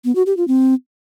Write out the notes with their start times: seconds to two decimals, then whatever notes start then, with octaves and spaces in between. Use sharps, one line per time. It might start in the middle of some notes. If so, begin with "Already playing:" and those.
0.05 B3
0.15 F#4
0.26 G4
0.37 F4
0.48 C4